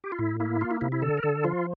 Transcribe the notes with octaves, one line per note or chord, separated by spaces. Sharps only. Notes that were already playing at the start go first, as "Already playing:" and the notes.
G4
F4
A2 E4
A#3 E4
A#3 F4
E4
C3 E4
E4
D3 A4
A#4
D3 A4
F3 F4